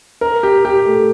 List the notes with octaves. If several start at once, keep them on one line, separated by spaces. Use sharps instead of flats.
A#4
G4
G4
A3